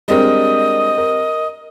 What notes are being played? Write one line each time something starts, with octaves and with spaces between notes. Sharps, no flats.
G3 G#3 C4 D4 A#4 D#5
A#4